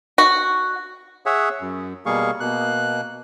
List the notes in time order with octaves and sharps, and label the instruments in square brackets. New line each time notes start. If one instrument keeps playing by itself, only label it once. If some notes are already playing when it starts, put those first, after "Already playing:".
[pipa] F#4
[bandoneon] G#4 C#5 E5 F#5
F#2
B2 G3 A#3 G#4 F5 C#6
B2 A#3 F#6